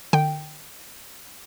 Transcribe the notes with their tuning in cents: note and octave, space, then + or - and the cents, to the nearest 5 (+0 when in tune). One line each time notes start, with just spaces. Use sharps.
D3 +45 G5 +0